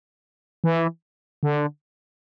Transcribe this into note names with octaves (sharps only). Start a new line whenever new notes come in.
E3
D3